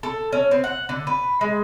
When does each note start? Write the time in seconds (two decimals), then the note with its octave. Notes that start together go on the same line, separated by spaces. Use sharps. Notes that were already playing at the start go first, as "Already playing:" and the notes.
0.03 A4
0.33 C#4
0.51 C4
0.64 F#5
0.89 D3
1.07 B4
1.41 G#3